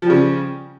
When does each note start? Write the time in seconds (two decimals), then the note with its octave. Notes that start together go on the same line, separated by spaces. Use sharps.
0.02 F3
0.06 G3
0.10 C#3